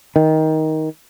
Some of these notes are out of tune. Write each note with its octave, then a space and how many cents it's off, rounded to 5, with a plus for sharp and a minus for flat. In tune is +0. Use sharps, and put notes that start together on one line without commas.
D#3 +15